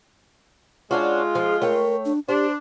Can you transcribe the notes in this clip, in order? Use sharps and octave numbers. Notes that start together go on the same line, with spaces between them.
G#3 C#4 D4 F4 F#4
F3 G#4
A3 A#4 C#5 G5
D4
D4 G4 C5